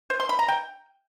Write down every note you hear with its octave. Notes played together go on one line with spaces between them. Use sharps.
C5
C6
B5
A#5
G5